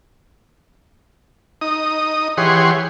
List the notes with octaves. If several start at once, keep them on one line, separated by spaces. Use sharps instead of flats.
D#4 D#6
E3 G4 G#4 C#5 F#5 C6